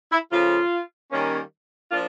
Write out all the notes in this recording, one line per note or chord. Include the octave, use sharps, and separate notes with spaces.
E4
C#3 F3 A3 F4
D#3 G3 A#3 C#4
F3 A#3 D4 F4